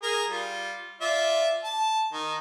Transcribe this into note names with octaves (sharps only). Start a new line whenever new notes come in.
G#4 A#4
G3 F4
F4 D5 E5
A5
D#3